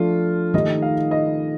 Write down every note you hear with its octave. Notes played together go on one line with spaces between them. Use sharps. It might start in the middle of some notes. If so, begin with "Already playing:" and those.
Already playing: F3 A3 D4 F4
D#3 A3 D#4 G4 D#5
F5
D#5